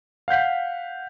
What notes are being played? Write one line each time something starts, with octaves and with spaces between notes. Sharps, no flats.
F5 F#5 G6 B6